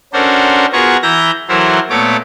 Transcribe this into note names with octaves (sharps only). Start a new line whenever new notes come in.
C#4 D4 F#4 A4 A#4 C5
B3 F4 F#4 G#4 A#4 C#6
E3 E4 A#5 G6 A#6
E3 F#3 E4 A4 A#4 C5
A#2 A3 B3 A4 C#5 D6